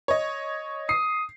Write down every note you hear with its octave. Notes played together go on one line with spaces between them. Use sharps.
C#5 D#5
D#6 C7